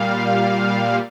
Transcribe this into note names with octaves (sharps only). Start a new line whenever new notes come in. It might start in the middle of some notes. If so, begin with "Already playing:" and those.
Already playing: A#2 G3 F5